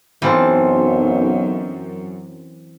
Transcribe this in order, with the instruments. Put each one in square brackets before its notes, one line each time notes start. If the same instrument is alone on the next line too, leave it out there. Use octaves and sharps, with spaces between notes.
[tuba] B1 [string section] F#2 [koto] E3 [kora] C4 F4 A4